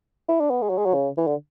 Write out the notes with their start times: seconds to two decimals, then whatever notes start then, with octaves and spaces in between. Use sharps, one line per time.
0.29 E4
0.40 D4
0.50 B3
0.62 G#3
0.69 F#3
0.78 G#3
0.86 F#3
0.94 C#3
1.17 E3
1.27 D3